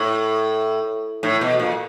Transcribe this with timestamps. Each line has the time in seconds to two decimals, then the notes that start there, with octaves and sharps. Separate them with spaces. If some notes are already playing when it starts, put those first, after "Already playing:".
Already playing: A2
1.23 A2
1.41 B2
1.59 A#2